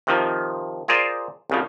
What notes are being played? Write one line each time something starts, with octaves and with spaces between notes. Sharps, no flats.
C3 D#3 F3
F4 G#4 A#4 C5 D5
C2 C#3 F3